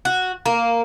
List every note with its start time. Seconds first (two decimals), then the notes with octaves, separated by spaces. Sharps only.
0.05 F#4
0.46 A#3